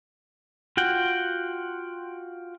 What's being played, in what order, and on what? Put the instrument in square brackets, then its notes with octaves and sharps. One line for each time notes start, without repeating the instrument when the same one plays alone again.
[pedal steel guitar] F4 F#4 F#5 G5